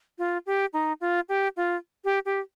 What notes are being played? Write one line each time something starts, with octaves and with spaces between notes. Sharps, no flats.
F4
G4
D#4
F4
G4
F4
G4
G4